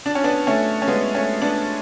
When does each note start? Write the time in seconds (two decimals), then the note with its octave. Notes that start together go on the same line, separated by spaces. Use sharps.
0.06 D4
0.15 C#4
0.24 B3 D4
0.47 A3 C#4
0.82 C#4
0.88 G#3 B3
1.15 A3 C#4
1.42 B3 D4